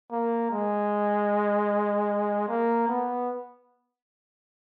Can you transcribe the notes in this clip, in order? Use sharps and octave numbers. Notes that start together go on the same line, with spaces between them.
A#3
G#3
A#3
B3